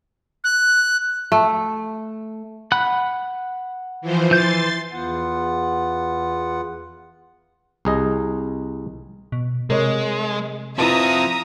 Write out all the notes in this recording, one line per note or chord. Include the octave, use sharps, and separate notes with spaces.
F#6
A3
F#5 B5 F#6
E3 F3 C5
E3 C6 G6 A6
E2 B3 F4 F#5
C2 G#4 D#5
B2
C3 G#3 A#4 C#5 D#5
C4 E4 F4 B4 E5 A5 A#5 D#6